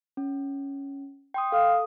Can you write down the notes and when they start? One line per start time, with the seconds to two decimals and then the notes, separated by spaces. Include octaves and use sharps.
0.17 C#4
1.34 G5 C6 D#6
1.52 A4 F5 D#6